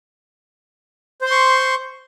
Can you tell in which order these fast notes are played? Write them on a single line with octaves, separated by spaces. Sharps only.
C5 C6 C#6